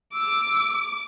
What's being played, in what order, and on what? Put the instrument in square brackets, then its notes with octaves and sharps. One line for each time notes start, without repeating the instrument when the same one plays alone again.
[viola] D6 [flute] E6